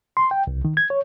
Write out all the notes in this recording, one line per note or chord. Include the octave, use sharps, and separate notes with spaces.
C6
G5
C2
D#3
G#6
C#5